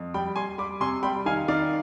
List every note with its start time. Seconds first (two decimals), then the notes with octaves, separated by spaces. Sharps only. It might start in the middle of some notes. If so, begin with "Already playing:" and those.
Already playing: F2
0.14 G3 G5 B5
0.36 G3 G#5 C6
0.58 G3 B5 D6
0.80 C3 G#5 C6
1.03 G3 G5 B5
1.26 D#3 F5 G#5
1.48 D#3 D5 F5